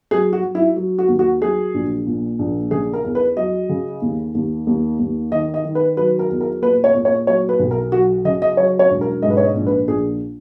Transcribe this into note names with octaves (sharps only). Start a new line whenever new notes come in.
F#3 G#4
F#4
F#3
E4
F#3
F#4
D#2
F#4
F#3 G#4
A#1
A#2
A#1
C#3 G#4
A#4
E2
B4
F#3 D#5
C#3
D#2
D#2
D#2
D#2
D#3 D#5
D#5
D#3
B4
F#3 B4
A#4
E2
A#4
A#2 B4
C#5
A#2
C#5
F#3 C#5
B4
B1
A#4
F#3 F#4
C#3 D#5
D#5
F#3 C#5
C#5
E1
A#4
G#2 D#5
B4
C#5
D#5
A#1
B4
A#1 G#4